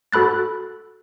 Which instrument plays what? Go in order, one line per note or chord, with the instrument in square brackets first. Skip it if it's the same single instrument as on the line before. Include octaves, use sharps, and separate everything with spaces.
[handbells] F#4 A4 B5 F#6 A6